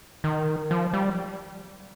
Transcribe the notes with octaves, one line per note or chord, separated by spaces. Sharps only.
D#3
F3
G3